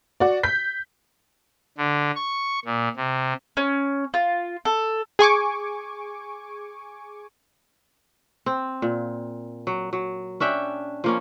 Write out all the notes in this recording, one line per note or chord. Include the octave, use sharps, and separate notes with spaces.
F#4 D5
G6 B6
D3
C#6
A#2
C3
C#4
F4
A4
G#4 G#5 C#6 D6
C4
A#2
F#3
F#3
C#4 D4 E5 G5
F3 A#3 C#4